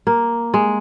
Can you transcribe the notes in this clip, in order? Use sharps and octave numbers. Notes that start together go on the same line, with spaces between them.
A#3
G#3